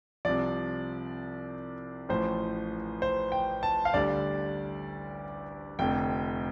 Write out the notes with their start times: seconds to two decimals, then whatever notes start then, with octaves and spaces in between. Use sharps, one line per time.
0.25 C2 C3 F3 D5
2.09 A1 A2 F3 C5
3.02 C5
3.32 G5
3.63 A5
3.85 F5
3.94 D2 D3 G3 D5
5.79 F1 F2 D3 G5